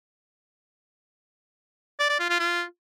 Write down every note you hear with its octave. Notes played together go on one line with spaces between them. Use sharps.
D5
D5
F4
F4
F4